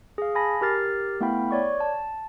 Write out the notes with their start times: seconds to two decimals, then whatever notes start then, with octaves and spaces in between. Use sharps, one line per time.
0.18 G#4 F5
0.35 G#5 A5 B5 A#6
0.61 G4 A#4 F6 A6 C7
1.20 A3 B3 E4 F5 G5 B5
1.51 C#5 D5 C#6
1.80 A5